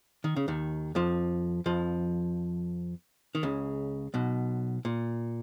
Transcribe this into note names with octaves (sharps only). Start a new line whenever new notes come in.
D#3
C#3
D#2 D#3
F2 F3
F2 F3
D#3
C#2 C#3
B1 B2
A#2